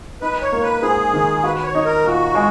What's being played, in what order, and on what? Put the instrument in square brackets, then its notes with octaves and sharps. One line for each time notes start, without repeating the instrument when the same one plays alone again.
[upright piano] D#4 [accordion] B4
[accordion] C#5
[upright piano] A#3
[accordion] B4
[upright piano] G#2 [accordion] G#4
[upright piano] D#3
[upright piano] F#4 [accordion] B4
[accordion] B4
C#5
[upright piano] D#4
[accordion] A#4
[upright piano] A#2 [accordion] F#4
[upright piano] G#3